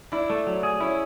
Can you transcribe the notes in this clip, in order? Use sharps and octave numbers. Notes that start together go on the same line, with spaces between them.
D4 E4
A3
F#3
G#4
C#4 E4